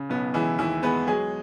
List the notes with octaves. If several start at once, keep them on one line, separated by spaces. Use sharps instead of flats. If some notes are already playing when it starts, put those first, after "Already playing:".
Already playing: C#3
B1 B3
E3 G#3 E4
D#2 E3 E4
G#3 B3 B4
F#3 G#3 G#4